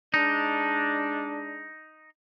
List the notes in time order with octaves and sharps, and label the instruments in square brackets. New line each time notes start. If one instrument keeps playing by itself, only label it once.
[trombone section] G#3 D4 [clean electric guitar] D#4